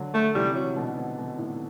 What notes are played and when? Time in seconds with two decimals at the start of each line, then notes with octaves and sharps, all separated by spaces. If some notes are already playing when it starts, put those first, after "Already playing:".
Already playing: D3 F#3
0.14 A3
0.35 C3 E3 G3
0.55 F#3
0.75 B2 D3
0.97 B2
1.18 B2
1.38 A2